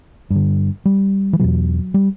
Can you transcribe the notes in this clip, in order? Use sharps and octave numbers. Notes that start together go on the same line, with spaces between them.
G2 D3
G3
E3
E2 B2 F#3
G3